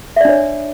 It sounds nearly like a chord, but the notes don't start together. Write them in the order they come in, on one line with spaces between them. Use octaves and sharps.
E5 D5 D4 C#5